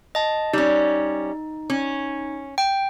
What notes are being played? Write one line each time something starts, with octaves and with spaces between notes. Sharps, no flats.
D#5 A5
G3 C#4 D#4
C#4
G5